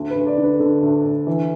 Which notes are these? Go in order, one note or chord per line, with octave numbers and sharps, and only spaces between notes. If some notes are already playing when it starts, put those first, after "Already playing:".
Already playing: D2
B4
D2
D5
D3
B4
D3 A4
D2
D2
E3